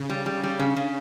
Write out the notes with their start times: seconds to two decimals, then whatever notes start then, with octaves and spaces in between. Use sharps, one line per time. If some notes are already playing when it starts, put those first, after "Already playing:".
Already playing: C#3
0.10 G3
0.26 G3
0.43 G3
0.59 C#3
0.76 C#3